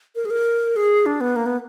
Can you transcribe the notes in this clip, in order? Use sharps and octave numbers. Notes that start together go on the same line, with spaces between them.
A#4
G#4
A#4
G#4
D4
B3
A#3
B3